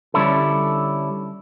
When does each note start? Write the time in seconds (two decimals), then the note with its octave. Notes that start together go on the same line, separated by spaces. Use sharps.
0.14 D3 G3 C#4 D4 E4 A4